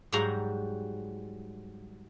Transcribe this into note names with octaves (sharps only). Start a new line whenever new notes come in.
G#2 F#3 G3 F#4 A#5